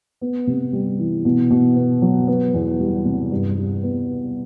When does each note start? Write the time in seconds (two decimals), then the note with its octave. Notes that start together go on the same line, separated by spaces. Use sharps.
0.21 B3
0.47 C3
0.73 G3
0.98 E3
1.25 B2
1.50 B2
1.76 B3
2.02 F#3
2.28 B3
2.54 E2
2.80 G3
3.05 C3
3.31 G2
3.57 G2
3.83 B3